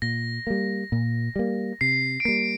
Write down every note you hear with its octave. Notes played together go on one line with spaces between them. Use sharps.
A#2 A#6
G3 A#3
A#2
G3 A#3
C3 C7
D7
G3 A#3 C7